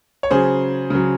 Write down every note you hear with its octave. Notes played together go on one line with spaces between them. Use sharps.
C#5
C#3 F#3 G#4 C5
C#3 F#3